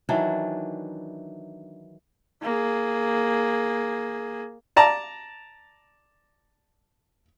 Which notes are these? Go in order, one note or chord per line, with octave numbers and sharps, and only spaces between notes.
D#3 E3 F#3 D4
A#3 G#4
D5 A5 A#5